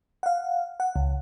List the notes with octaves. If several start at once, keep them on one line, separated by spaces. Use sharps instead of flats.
F5 F#5
F#5
C#2